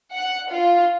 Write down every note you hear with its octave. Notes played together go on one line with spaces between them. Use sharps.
F#5
F4